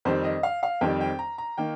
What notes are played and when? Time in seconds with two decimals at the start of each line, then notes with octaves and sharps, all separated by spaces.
0.05 F2 D#3 G3 C4 C5
0.24 D#5
0.43 F5
0.63 F5
0.81 F2 D#3 G3 C4 G5
1.01 G5
1.19 A#5
1.38 A#5
1.58 D#3 A#3 G5